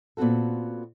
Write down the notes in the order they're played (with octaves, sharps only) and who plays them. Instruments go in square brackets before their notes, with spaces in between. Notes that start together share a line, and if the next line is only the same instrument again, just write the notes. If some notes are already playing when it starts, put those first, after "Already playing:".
[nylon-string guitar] A#2 B3 C4 F#4 A4